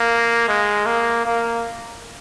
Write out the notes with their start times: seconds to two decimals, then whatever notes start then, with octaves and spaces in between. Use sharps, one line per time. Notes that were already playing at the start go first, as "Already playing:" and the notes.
Already playing: A#3
0.48 G#3
0.86 A#3
1.26 A#3